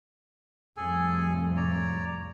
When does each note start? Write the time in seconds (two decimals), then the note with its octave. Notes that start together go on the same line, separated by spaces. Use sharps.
0.77 C2 F2 A2 G#4 A4 G#5
1.56 C#5 D5 A#5